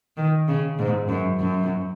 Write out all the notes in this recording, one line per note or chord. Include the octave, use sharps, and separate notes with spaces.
D#3
C#3
G#2
F#2
F#2